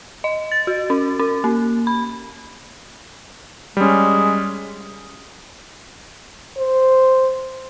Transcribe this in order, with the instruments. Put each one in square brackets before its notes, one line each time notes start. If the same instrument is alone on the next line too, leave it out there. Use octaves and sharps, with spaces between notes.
[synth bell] D#5
A6
F#4
C#4
C#4
A#3
B5
[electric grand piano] G3 C#4 [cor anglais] G#3
[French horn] C5